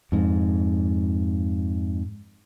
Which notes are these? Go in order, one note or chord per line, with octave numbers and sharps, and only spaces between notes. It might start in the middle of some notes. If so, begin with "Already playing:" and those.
F2 G#2